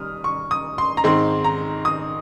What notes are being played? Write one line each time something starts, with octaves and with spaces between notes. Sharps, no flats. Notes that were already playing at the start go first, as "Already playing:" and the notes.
Already playing: G3 D#6 F6
C#6
D#6
C6
A#5
G#2 D#3 G#3 C4 C6
A#5
D#6